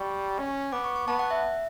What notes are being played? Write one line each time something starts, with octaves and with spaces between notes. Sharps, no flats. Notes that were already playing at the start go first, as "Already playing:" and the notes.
Already playing: G3 C#6
C#4
B3 D6
C#6
C#6
B3 A5
F#5
E5